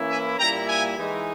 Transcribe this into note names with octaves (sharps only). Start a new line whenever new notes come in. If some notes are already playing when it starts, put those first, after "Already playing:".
Already playing: E3 A#3 C#4 E4
E5 G#5
A#2 G3 A#3 E4 G5 A#5
E5 G#5
E3 G#3 D#4